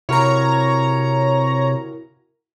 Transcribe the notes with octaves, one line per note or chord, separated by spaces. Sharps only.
C3 E4 F#4 A#4 C#5 A#5